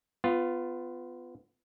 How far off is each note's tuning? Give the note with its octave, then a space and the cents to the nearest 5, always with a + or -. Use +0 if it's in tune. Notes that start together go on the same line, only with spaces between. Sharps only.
B3 +20 F4 +0